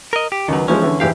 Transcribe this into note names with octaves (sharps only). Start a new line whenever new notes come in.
A#4 D#5
G4
C#2 D#3 F#3 B4
E3 F3 G#3 C#4
D3 E3
G#2 E3 G3 G#3 G4 F5